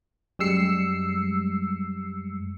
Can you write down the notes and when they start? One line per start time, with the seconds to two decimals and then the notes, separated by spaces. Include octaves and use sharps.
0.39 F#2 G3 G#3 E6 C7 C#7